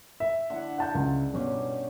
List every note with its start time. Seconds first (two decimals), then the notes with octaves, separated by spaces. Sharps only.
0.20 E5
0.50 D3 E4 F#5
0.78 F#5 G#5 A5 G6
0.95 C#2
1.34 G2 B2 C#4 D#4